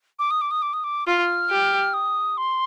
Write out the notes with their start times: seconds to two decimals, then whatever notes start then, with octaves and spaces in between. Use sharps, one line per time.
0.19 D6
0.31 D#6
0.41 D6
0.51 D#6
0.62 D6
0.73 D#6
0.84 D6
1.07 F4 F6
1.50 G4
1.94 D#6
2.37 C6